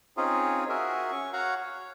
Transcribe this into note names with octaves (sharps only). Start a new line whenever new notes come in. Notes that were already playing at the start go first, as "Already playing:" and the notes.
C4 C#4 D#4 F4 G#4
F#4 G#4 A#4 E5
C#4 C#6
F#4 C#5 F5 F#5 A#5
C#5